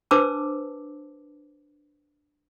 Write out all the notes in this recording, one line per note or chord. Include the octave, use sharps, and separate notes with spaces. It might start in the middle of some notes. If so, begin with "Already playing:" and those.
D4 B4 C5 A5 D6 E6